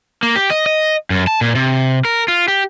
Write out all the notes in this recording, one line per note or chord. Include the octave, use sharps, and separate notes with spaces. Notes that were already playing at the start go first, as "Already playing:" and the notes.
A#3
G4
D#5
D#5
F#2
A5
A#2
C3
A#4
F4
G4